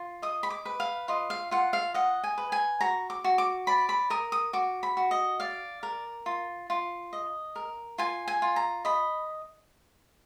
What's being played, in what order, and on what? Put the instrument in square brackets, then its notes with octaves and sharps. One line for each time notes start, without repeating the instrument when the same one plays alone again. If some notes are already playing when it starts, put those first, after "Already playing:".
Already playing: [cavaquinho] F4
D#5 D#6
B5
D6
B4
F5
F4 D#5
F5
F4 F#5
F5
D#5 F#5
G#5
B4
G#5
F#4 A#5
D6
F#4
D6
D5 B5
B5
A#4 D#6
D#6
F#4 D6
B5
F#4
D#5
D5 F5
A#4
F4
F4
D#5
A#4
F4 G#5
G#5
F4
A#5
D#5 B5